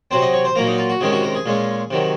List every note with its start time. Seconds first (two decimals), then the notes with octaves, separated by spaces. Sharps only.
0.11 C3 F#3 C4 C5
0.22 D#5
0.34 C#5
0.45 C5
0.55 A#2 F#3 A#3 A#4
0.67 D#4
0.78 F4
0.90 F#4
1.01 C3 D#3 G#3 C#4 G#4
1.13 F#4
1.23 A#4
1.35 G#4
1.46 A#2 G#3 C#4
1.91 C3 D#3 F#3